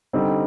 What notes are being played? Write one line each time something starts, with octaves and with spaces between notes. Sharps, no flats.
D3 G3 C4 D#4